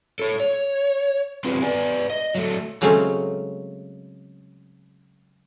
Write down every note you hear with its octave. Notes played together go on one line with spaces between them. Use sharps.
A4 C#5
C#5
C4 E4 F4 G4 G#4 B4
B4 D5 G#5
D#5
F#3 A3
C#3 F#3 G#3 A3 C4 C#4